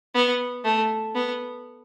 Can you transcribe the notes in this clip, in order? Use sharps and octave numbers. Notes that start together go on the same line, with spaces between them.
B3
A3
B3